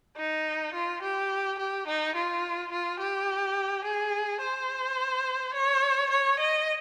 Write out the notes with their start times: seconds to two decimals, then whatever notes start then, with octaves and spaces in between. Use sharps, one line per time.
0.17 D#4
0.74 F4
1.02 G4
1.59 G4
1.87 D#4
2.16 F4
2.72 F4
3.00 G4
3.84 G#4
4.41 C5
5.54 C#5
6.11 C#5
6.39 D#5